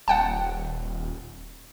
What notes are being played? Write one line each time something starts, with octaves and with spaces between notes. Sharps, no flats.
D#1 F#5 G5 A5